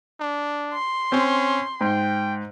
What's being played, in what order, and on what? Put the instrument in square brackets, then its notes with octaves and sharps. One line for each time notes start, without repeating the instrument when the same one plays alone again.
[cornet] D4
[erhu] C6
[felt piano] C4 [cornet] C#4
[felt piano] G#2 [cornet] G5